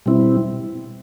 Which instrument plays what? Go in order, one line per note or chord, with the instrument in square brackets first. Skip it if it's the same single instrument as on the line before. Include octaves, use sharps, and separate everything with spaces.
[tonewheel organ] B2 G3 C4 E4